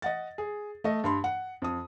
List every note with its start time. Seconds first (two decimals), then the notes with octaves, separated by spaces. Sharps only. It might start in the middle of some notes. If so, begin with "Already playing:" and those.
0.02 D#5 F#5 A6
0.38 G#4
0.84 A3 D#5
1.04 G2 B5 C6
1.24 F#5
1.62 F2 D#6